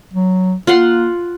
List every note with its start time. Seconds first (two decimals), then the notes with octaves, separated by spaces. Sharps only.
0.14 F#3
0.67 A#3 F4 F#5 C6